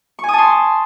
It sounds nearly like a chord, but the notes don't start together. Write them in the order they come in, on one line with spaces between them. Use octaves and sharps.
C#6 G#5 D#6 A5 C6